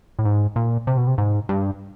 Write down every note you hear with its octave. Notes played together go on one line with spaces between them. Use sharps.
A2
G#2
A#2
C3
B2
C3
G#2
G2